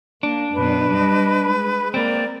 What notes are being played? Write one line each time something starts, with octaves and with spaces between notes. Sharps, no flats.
A#3 D4
F#2 B2 B4
G3 D#5
G#3
A#3 C4 A#4 D5